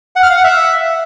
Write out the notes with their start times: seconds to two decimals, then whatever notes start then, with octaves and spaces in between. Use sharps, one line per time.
0.16 F#5
0.23 F6
0.30 F5
0.37 F#5
0.44 E5